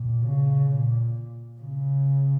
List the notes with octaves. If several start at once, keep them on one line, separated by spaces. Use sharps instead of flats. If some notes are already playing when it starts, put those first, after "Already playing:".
Already playing: A#2
C#3
A#2
C#3